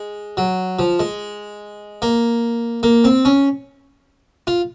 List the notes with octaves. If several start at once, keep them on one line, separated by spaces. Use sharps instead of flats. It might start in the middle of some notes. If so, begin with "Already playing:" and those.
Already playing: G#3
F#3
F3
G#3
A#3
A#3
C4
C#4
F4